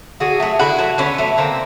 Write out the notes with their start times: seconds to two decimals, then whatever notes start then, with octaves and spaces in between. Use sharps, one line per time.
0.20 D3 F#4 G#4
0.40 F#3 A3
0.59 D3 E4 F#4
0.79 F#3 A3
0.98 D3 B3 C#4
1.18 F#3 A3
1.38 D3 A#3 C4